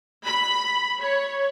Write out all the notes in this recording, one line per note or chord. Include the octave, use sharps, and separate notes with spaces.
B5
C#5